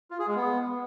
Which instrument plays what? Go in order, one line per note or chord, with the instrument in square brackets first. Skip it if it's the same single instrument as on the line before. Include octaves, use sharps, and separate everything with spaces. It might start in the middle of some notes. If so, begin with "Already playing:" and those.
[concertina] F4
G#4
G#3
B3